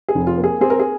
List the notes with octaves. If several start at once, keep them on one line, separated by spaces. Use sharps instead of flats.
G#4
F1
F4
A#3
G#4
C4 G#4
A#4
G#4